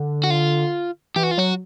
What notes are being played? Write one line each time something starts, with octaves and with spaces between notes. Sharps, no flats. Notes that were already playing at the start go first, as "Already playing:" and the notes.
Already playing: D3
F#4
F4
E3 G4
F#4
F4
F#3 F#4